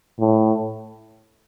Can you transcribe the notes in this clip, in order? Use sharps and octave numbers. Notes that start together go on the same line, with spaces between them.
A2